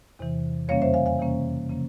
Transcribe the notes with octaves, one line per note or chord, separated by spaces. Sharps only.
E2 C3 E3
F2 C#3 G3 A#3 C#4 C#5 F5
C5 E5
F5 G#5
F5 G#5
C3 E3 A#3 C#4
C#3 F3 A#3 C#4